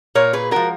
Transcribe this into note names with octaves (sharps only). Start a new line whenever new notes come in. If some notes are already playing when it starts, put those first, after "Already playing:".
A#2 A#4 C#5
G#4 B4
F3 G#3 F#4 A#4